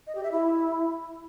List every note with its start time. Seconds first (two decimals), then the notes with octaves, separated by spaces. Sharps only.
0.07 D#5
0.15 G4
0.23 E5
0.31 E4